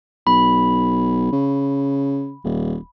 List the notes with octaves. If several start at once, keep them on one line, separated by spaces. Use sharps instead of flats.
B1 B5
C#3
D#1